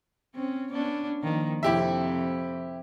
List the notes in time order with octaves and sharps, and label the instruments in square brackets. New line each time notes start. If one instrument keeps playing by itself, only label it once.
[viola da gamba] C4 C#4
B3 C#4 D4
D#3 F3 A#3
[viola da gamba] F2 C3 [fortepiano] E4 G4 E5